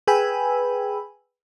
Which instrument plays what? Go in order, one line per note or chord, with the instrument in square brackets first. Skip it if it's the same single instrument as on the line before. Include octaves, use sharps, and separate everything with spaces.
[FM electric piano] G#4 B4 G5 G#5 B5 E6